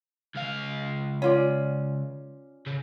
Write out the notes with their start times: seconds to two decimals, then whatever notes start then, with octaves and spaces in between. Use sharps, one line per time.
0.35 C#2 F5
1.22 C#4 F4 D5
2.66 C#3